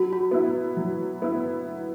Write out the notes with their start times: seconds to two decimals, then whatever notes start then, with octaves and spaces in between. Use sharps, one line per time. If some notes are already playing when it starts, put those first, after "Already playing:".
Already playing: F#3 F#4
0.13 F#4
0.31 B3 E4
0.77 F#3
1.22 B3 E4